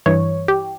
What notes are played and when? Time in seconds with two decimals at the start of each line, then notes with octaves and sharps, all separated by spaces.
0.06 G2 E3 C#5
0.48 G4